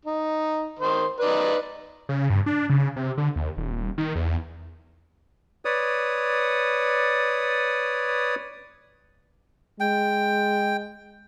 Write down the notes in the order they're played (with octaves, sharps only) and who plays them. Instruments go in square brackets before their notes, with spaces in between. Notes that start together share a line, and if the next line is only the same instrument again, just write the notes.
[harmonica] D#4
D#3 C5
D#4 B4 D5
[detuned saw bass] C#3
G2
D4
C#3
C3
D3
D#2
D#1
D#1
D#3
E2
[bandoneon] B4 C#5 D5 D#6
[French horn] G#3 [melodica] G5